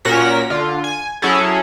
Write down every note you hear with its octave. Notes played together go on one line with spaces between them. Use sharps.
A#2 C#4 F#4 A#4 A#6 B6
D3 F4
G#5
F#3 C#4 E4 G#4 A4